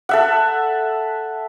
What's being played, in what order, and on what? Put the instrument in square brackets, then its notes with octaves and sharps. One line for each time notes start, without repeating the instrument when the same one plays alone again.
[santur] A4 E5 F#5